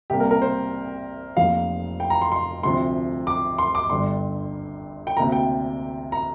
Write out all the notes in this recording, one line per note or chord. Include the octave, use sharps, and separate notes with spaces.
C2 C3 G3 A#3 G4
A#4
A#4
C5
F1 F2 F3 A#3 F5
G5
A#5
C6
C6
D2 C3 F3 C6
D6
C6
D6
G1 G2 D3 G3 C6
G5
D2 C3 A#3 A#5
G5
A#5